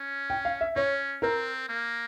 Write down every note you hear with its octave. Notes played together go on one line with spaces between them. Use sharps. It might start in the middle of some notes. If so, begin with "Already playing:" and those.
Already playing: C#4
G5
F5
E5
C#4 C#5
C4 A#4
A#3